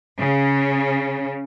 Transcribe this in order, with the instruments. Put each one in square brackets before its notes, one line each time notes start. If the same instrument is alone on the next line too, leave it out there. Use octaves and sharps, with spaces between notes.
[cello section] C#3